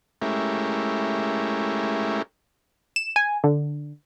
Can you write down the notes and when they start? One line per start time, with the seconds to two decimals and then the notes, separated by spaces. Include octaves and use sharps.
0.22 G#3 A3 C#4 E4 G4 A#4
2.96 E7
3.16 G#5
3.44 D3